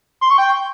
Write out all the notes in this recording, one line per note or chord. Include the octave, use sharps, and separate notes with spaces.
C6
C#6
G5